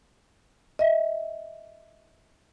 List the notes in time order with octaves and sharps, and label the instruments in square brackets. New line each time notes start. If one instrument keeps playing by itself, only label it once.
[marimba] D#5 E5